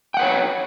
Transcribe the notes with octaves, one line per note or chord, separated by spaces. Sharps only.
B4 C#5 F#5 G5